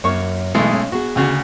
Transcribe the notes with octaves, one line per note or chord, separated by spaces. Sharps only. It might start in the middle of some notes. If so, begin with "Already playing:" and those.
F#2 A#3 C#5 C#6
B1 E3 G#3 A3
C#4
B3 F#4 G#4
D2 C#3 F#4